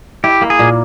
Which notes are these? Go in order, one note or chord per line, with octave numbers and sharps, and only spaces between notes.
E4 G4
A#3
G#4
A#2